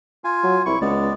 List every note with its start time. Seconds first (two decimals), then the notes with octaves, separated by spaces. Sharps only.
0.24 F4 G#5
0.44 F#3
0.66 C2 E4 C#6
0.81 C#2 G#3 B3 D5